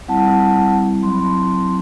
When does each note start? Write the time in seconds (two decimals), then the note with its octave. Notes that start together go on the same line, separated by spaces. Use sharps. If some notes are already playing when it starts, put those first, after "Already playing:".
0.08 G3 C4 E4 F#5 A5
1.02 F#3 C4 E4 C6
1.13 B5
1.21 A5 C6